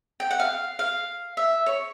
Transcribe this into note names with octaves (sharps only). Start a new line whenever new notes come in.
G5
F#5
F5
F5
E5
C#5